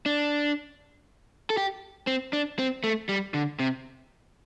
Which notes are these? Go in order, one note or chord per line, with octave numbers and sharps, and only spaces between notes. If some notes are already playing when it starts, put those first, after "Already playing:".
D4
A4
G4
C4
D4
C4
A3
G3
D3
C3